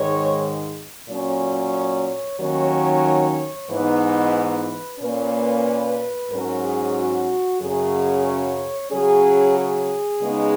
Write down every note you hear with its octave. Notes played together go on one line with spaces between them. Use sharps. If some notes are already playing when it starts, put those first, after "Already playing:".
Already playing: G#2 D#3 G#3 C#5
A#2 F#3 C#4 C#5
D#2 D#3 F#3 C#4 C#5
G#2 E3 B3 D#4 B4
B4
A#2 A#3 C#4 B4
G#2 F#3 C#4 A#4
G#4
F#4
F#2 C#3 F#3 C#4 G#4
C#5
C#3 F#3 C#4 G#4
G#4
C#3 G#3 B3 D#4